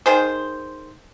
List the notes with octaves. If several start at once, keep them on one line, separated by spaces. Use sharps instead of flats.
D#3 G#4 C5